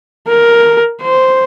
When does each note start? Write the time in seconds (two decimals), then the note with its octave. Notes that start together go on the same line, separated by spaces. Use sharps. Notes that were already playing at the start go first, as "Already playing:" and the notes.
0.28 A#4
1.02 C5